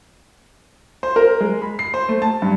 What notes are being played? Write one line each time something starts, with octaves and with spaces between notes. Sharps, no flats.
C5
A#4
G#3
B5
C7
C5
A3
A5
G2